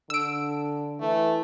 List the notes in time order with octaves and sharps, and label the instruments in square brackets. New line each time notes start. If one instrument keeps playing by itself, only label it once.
[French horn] D3 [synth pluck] E6 D7
[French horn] E3 [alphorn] A3